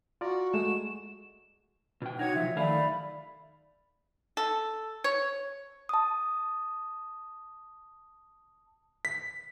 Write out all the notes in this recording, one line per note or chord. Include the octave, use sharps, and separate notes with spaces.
F4 F#4 D5 A#5
G#3 A3 E7
B2 G5
D#4 F#4 C#5 F#5 G#6
C3 F3 F#3 E5
D#3 A3 D5 E5 F5 B5
A4
C#5
A5 D#6
B6